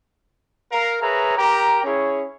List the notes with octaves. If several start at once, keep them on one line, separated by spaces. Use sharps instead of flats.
A#4 F5
G#4 A#4 B4 C#5 E5 A#5
G4 A#4 G5 A#5
C#4 E4 G#4 C#5